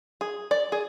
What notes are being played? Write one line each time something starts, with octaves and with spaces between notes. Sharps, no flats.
G#4
D5
G#4